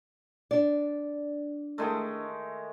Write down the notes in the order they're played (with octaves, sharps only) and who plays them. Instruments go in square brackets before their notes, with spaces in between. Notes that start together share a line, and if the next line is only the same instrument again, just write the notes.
[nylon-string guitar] D4 D5
[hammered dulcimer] D#3 G#3 A3